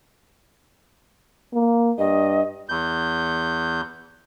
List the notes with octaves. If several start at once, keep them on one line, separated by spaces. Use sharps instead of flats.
A#3
G2 D#5
E2 G6